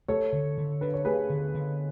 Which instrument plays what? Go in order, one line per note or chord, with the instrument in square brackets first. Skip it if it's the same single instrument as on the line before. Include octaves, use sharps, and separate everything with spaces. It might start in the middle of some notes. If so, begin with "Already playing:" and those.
[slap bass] A3 [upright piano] A4 C#5
[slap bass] D3
D3
[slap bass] D4 [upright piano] B4
[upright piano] C#5
[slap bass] A3 [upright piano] G#4 B4
[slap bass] D3
D3